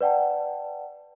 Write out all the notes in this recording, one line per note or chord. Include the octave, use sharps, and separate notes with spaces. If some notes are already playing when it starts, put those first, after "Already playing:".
B4 D5 F#5 G5 A5